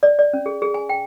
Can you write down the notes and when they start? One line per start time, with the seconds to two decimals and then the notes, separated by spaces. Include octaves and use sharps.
0.03 D5
0.19 D5
0.33 C#4
0.46 G#4
0.62 G#4
0.74 G#5
0.89 G5